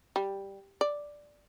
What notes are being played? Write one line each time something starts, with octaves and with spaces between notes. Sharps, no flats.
G3
D5